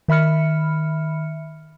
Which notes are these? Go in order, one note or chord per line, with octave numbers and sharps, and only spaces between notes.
D#3 E5 B5 F6 C#7